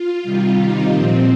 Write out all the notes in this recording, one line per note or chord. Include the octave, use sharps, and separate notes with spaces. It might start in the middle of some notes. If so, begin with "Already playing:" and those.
Already playing: F4
C3 D#3 G3
D#4
A#2 F3 C4